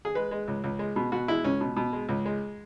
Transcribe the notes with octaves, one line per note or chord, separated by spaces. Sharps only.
G#4
G#3 B4
G#3
C#2
C#2
G#3
B2
B2 F#4
G#3 E4
C#2 C#4
B2
B2
G#3
C#2
G#3